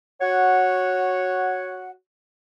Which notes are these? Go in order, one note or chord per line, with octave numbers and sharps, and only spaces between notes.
F#4 C#5 F#5